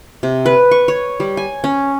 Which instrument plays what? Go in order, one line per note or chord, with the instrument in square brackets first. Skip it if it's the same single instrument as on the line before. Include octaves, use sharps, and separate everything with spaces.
[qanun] C3
B4
C#6
C#5
G3
G#5
C#4